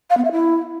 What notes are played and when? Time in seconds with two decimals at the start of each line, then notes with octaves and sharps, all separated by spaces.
0.10 F5
0.17 B3
0.25 E5
0.32 E4